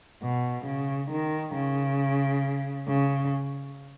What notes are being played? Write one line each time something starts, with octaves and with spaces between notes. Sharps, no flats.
B2
C#3
D#3
C#3
C#3